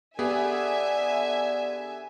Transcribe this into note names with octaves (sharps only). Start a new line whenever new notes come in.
D3 B3 G4 G#4 E5 G#5